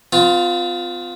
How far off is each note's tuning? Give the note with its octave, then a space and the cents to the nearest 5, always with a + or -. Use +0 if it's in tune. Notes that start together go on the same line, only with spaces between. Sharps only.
C4 -45 F4 +10